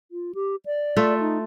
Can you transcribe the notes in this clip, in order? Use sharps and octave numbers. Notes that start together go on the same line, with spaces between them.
F4
G4
D5
A3 F4 E5
D#4